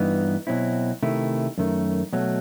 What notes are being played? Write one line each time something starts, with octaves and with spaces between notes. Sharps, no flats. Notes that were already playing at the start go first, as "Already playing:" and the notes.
Already playing: G2 E3 B3 D#4
B2 F#3 C4 E4
C3 D#3 A3 E4
F#2 D#3 A3
B2 F#3 A3